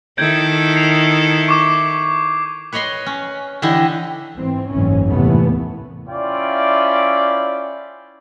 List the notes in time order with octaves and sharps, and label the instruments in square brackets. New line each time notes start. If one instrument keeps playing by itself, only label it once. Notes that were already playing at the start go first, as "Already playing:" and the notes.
[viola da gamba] D#3 E4 A4 [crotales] G6 G#6 D7
[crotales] C7 F7
C#6 D6
[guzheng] B4 C#5 D#5 B5 C6
C#4
D3 E3 E4 G4 D#5
[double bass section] G#2 E3 C4
F#1 C2 G#2 E3 C#4
D#2 A2 C3 E3 A3 B3
[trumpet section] C#4 E4 F4 D5 E5 G5